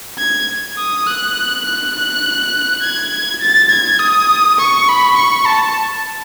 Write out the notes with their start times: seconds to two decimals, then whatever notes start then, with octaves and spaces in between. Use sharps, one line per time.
0.19 G#6
0.78 D#6
1.07 F#6
1.65 F#6
1.95 F#6
2.82 G#6
3.41 A6
3.71 G#6
3.99 D#6
4.59 C#6
4.89 B5
5.17 C#6
5.46 A5